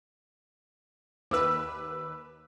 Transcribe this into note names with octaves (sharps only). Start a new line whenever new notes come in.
D#2 B4 D6 E6